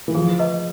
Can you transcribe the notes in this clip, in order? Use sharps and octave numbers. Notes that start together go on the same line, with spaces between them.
E3
F3 G#4
B4 D#5